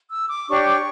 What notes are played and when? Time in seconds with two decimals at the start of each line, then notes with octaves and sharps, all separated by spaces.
0.10 E6
0.29 D6
0.48 D4 G4 C#5 C#6